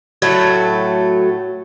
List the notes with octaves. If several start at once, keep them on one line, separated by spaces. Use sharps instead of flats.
A2 F#3 A3